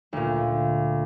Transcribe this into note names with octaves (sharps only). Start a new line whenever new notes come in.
D2 A#2